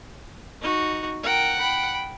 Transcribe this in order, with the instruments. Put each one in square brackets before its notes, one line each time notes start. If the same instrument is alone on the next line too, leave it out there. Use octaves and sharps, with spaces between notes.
[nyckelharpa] D#4 F#4
[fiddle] A#4 G5 [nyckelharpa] F#5
[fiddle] G5 B5